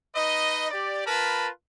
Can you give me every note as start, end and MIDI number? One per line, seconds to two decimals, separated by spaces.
0.15 0.69 63
0.15 0.69 71
0.15 0.69 75
0.71 1.03 67
0.71 1.03 74
1.06 1.48 65
1.06 1.48 70
1.06 1.48 71
1.06 1.48 81
1.06 1.48 83